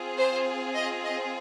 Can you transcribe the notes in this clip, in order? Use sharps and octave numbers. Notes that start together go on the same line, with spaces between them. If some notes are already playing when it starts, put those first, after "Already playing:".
Already playing: C4 F4 G#4
C5
D#5
D#5